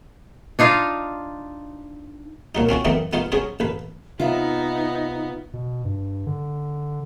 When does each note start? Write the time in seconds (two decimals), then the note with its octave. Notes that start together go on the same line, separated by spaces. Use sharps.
0.59 D4 D#4 F4 F5
2.55 A#2 F#3 D#4
2.69 C4 C#4 F4 F#4
2.85 F#2 A2 E3 B3 C4 D#4
3.13 B3 D#4 F4 C5
3.32 F#3 C#4 G#4 C5
3.60 A1 B4
4.20 C3 B3 C4 D#4 F4 E5
5.54 B2
5.85 G2
6.27 D3